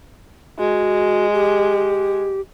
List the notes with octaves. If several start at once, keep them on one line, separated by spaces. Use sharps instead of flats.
G#3 F#4
G4